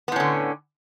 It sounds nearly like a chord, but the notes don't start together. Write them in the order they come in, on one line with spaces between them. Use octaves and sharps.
B3 A2 C#4 D3